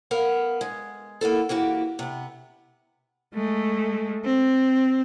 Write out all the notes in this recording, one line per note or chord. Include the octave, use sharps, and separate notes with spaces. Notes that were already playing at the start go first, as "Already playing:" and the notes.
B3 A#4 F5
G#3
A#3 B3 E4 A4
E3 A#3 F#4 G4
C3 B3
G#3 A3
C4